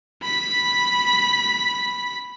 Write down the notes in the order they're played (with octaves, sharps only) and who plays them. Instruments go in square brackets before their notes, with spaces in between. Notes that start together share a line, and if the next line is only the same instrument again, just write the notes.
[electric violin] B5 B6